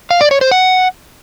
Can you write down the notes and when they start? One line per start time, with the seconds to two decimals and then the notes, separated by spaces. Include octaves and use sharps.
0.11 F5
0.21 D5
0.31 C#5
0.41 C5
0.51 F#5